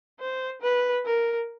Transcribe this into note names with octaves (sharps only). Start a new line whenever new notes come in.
C5
B4
A#4